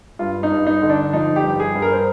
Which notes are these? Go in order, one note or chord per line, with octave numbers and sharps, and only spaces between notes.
G2 F4
D#4
G2
D#4
D3
D4
F3 D#4
G4
G2
G#4
G2
A#4
C5